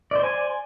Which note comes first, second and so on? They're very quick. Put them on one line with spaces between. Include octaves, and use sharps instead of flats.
D5 C5 C6 G#5